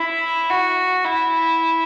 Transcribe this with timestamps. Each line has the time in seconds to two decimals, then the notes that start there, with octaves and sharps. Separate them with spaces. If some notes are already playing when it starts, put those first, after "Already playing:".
Already playing: E4
0.49 F#4
1.05 E4